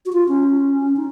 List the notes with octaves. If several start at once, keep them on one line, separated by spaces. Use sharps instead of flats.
F#4
F4
C#4
D#4